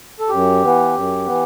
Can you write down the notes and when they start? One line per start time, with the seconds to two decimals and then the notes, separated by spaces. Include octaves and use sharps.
0.20 A4
0.29 F#2 G4
0.62 E3 B3
0.95 F#2
1.26 E3 B3